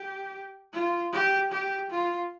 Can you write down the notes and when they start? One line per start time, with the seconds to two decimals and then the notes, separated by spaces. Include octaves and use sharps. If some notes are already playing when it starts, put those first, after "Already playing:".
Already playing: G4
0.73 F4
1.13 G4
1.52 G4
1.90 F4